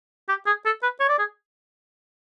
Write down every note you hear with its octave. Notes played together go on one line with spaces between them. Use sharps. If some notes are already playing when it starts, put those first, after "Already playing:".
G4
G#4
A4
B4
C#5
D5
G#4